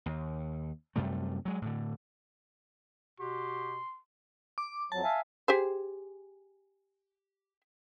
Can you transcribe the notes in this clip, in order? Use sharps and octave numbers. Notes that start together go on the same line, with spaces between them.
D#2
F#2 C3 G3 A3
F#3 G#3
A2 D3
B2 F#4 G4 C6
D6
F2 F#3 A5
E5 F5 G#5
G4 G#4 C5